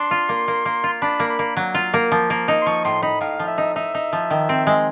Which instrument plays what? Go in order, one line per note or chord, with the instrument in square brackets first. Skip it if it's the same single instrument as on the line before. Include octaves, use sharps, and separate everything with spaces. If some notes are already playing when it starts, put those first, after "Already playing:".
Already playing: [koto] D4 [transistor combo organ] C6
[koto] F4
A#3
A#3
A#3
F4
[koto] D4 [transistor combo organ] B5
[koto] A#3
[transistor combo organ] B5
[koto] A#3
F#3
F4
A#3
F3
A#3
D#4
[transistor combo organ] C6
[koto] F3 [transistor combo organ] C#6
[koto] A2 [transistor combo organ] C6
[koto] D#4 [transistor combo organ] B5
[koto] A2 [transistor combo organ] F5
[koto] F3
[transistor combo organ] E5
[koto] D#4
[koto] D#4 [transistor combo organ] E5
[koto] D#4
F3
D#3
C4
G#3